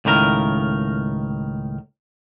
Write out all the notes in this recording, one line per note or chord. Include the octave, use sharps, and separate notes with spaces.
C#2 A2 D#3 A#4